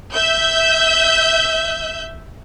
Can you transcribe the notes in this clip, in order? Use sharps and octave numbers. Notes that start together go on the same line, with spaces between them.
E5 G6